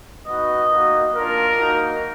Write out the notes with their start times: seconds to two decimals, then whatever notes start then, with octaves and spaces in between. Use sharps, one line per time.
0.27 B3 D#4 F#4 D#5
0.71 A#3 D#4 F#4
1.14 A#3 D4 F4 A#4
1.58 A#3 D#4 F#4